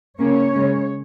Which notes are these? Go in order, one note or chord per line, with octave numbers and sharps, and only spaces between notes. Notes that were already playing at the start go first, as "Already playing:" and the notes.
C#3 A#3 C#4 C#5
C#3 G#3 C#4